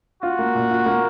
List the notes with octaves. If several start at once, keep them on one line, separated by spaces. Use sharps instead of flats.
F4 F#4
A#3
A#2
F4
A#3